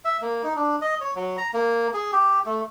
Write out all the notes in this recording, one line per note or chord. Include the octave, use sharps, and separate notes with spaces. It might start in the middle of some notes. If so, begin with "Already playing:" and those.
E5
A#3
D#4
D4
D#5
C#5
F#3
A#5
A#3
G#4
G4
A3